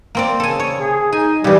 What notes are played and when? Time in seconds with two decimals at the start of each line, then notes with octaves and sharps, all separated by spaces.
0.15 A#3 C4 D5
0.40 C#3 A4 G#5
0.60 C#5
0.81 G#4
1.12 D#4 G#5
1.44 C#3 E3 G3 G4